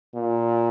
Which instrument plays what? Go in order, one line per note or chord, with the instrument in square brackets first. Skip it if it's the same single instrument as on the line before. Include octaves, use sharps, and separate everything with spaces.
[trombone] A#2